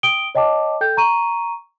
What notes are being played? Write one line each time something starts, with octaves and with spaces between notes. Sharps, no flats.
G5 D#6 D7 G7
C#5 D#5 G5 A5 D6
A4 G5 G6
A#5 C#6 D#7